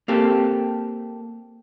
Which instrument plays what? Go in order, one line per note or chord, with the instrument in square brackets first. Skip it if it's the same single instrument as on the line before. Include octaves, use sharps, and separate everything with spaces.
[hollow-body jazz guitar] A#3 C4 G4 A4